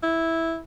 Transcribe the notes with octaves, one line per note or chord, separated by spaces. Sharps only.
E4